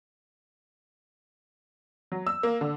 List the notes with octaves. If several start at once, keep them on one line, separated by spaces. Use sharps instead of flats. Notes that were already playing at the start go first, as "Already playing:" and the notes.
F#3
E6
A#3
D3